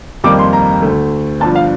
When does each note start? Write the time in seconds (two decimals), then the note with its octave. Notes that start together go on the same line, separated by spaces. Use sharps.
0.24 F2 D#3 G3 A#3 D6
0.39 C6
0.53 A#5
0.82 D2 D3 A3
1.40 G1 G2 F3 A5
1.55 F5